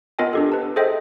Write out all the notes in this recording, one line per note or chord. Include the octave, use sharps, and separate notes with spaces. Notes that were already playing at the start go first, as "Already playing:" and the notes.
B3 F4 A#4 D#5 G5 G#5
D4 G4 A4
B4 A5
G#4 A4 C5 D#5 E5 G5